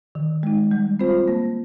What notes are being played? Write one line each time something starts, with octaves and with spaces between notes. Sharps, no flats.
D#3
G#3 D#4
G3
C4 F4 C5
A#3